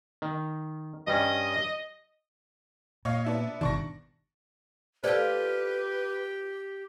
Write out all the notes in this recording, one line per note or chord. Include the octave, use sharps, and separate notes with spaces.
D#3
G2 G3 C#4 D#5
A#2 C#5 D#5 F5
B3 D4 E5
G1 B2 D#3 D4 C#6 A#6
F4 G4 A4 B4 C5 D5